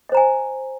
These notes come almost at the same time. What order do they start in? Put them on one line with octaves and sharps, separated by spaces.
D#5 C5 A#5 G#5